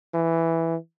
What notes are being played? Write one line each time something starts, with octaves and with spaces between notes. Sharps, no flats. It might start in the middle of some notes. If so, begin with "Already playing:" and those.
E3